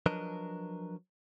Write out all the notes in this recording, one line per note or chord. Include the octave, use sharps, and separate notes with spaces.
F3 F#3 D4 A#4 B4 D#5